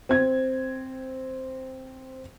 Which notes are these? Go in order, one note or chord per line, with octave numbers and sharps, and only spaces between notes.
C4 G#6